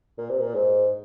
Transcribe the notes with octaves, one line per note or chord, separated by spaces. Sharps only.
A#2
C3
A#2
G#2